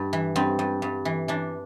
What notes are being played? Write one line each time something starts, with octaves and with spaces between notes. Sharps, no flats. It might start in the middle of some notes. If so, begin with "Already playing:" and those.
Already playing: G2
E3
G2 C4
G2
G2
E3
E3 D4